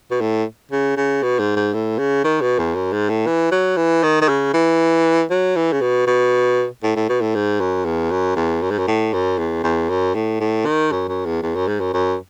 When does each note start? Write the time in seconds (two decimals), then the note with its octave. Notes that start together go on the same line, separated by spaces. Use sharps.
0.11 B2
0.21 A2
0.72 C#3
0.97 C#3
1.23 B2
1.39 G#2
1.56 G#2
1.74 A2
1.98 C#3
2.24 D#3
2.41 B2
2.59 E2
2.75 F#2
2.93 G#2
3.09 A2
3.27 E3
3.52 F#3
3.77 E3
4.03 D#3
4.21 D#3
4.29 C#3
4.54 E3
5.30 F#3
5.56 E3
5.72 C#3
5.81 B2
6.07 B2
6.83 A2
6.96 A2
7.09 B2
7.22 A2
7.35 G#2
7.60 F#2
7.85 E2
8.11 F#2
8.36 E2
8.62 F#2
8.71 G#2
8.78 F#2
8.87 A2
9.13 F#2
9.38 E2
9.63 E2
9.90 F#2
10.14 A2
10.40 A2
10.65 D#3
10.92 F#2
11.08 F#2
11.26 E2
11.42 E2
11.55 F#2
11.68 G#2
11.80 F#2
11.93 F#2